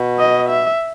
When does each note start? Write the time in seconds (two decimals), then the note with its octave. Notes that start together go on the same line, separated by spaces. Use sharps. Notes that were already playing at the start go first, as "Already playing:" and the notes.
Already playing: B2
0.19 D#5
0.50 E5